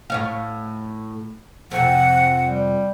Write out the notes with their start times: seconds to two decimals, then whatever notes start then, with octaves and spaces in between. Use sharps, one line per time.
0.10 A2 C#5 F5
1.71 F2 C3 F3 F#5
2.47 G3